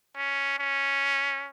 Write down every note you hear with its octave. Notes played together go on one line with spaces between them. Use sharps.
C#4
C#4